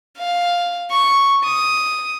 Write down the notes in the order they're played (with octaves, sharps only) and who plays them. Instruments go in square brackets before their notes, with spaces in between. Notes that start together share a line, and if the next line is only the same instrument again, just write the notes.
[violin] F5
C#6
D#6